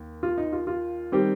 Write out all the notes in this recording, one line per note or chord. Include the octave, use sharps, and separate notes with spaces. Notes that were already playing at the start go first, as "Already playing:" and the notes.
Already playing: D#2
F4
D#4
F4
F4
D#3 G3 C4 G4